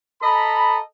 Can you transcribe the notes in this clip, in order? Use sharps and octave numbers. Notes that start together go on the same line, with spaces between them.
A4 D#5 A#5 B5